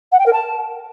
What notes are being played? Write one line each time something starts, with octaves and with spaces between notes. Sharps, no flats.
F#5
G5
A#4
A5